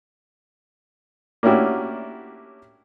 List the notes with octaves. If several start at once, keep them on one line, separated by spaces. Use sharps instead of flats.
A#3 C#4 D4 E4 F#4 G4